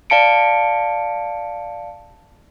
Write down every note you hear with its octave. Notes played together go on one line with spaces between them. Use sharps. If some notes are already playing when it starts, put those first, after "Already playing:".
D5 F5 A5 C#7 D7